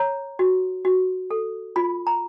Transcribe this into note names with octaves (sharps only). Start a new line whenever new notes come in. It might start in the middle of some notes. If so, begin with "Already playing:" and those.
Already playing: C#5 A#5
F#4
F#4
A4
F4 B5
A#5